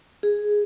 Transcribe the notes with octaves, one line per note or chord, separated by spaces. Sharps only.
G#4